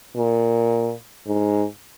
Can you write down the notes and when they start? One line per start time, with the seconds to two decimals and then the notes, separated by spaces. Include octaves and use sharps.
0.16 A#2
1.27 G#2